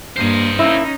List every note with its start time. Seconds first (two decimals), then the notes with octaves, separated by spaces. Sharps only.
0.16 G2 A#3 C5 D#5
0.59 A#3 C#4 D#4 E4